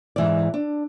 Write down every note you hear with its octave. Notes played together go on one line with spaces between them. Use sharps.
G#2 E3 D5
D4